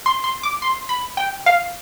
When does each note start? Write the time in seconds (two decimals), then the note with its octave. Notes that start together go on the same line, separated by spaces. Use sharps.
0.06 C6
0.24 C6
0.43 D6
0.62 C6
0.89 B5
1.17 G5
1.46 F5